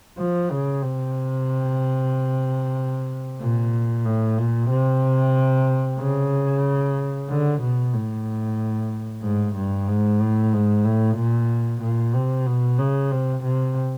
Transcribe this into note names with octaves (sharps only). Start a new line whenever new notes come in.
F3
C#3
C3
A#2
A2
A#2
C3
C#3
D3
B2
A2
G#2
G2
G#2
A2
G#2
A2
A#2
A#2
C3
B2
C#3
C3
C3